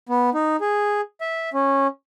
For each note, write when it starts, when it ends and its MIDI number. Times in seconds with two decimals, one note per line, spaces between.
0.09 0.30 59
0.34 0.56 63
0.61 1.01 68
1.21 1.49 76
1.54 1.87 61